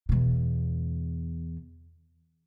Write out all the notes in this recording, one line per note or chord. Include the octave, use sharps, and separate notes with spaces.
E2 B2